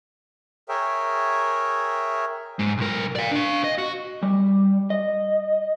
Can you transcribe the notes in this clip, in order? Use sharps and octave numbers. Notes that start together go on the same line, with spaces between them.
G#4 A#4 C#5 E5 G5
G#2 G#3
B1 A#4
D5 F5
D4 F5
D#5
F#4
G3
D#5